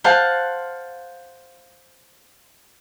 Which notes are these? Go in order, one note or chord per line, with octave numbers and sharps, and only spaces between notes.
C5 F5 F#5 A5